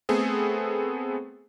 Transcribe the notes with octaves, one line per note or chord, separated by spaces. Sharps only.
A3 B3 C4 G#4 A4